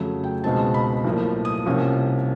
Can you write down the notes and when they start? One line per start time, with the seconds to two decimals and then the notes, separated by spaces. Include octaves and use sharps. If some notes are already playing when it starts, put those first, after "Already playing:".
Already playing: F2 C#3 F#3 A3
0.24 G5
0.44 C#2 B2 G#3 C4 D#4 A5
0.74 B5
1.04 B1 A2 F3 A#3
1.45 D#6
1.65 C2 C3 F3 A#3 C#4